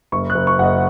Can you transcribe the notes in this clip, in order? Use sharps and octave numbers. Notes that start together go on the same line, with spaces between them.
F#1 C#6
F#6
F#1
C#6
F#1 D#5 F#5